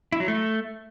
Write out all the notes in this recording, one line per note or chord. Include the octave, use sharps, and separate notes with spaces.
E4
F#3
A3